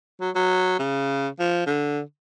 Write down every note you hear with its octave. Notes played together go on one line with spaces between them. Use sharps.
F#3
F#3
C#3
F3
D3